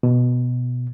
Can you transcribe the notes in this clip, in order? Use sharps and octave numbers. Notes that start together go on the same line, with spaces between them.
B2